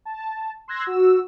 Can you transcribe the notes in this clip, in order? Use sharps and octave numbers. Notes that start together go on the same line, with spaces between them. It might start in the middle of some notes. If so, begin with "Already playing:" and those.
A5
C6 E6 F#6 G#6 A#6
F#4 E6